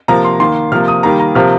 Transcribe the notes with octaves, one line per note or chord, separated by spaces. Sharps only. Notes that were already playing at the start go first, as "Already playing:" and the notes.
C3 F3 A#3 A#5
C6
D#3 A#3 C6
C3 F3 A#3 F6
D#6
D#3 G3 A#3 A#5
A#5
C3 F3 A#3 F6